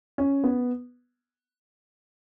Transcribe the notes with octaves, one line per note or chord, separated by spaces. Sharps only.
C#4
B3